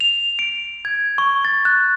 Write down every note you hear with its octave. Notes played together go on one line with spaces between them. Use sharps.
F7
D7
G#6
C#6
A6
F#6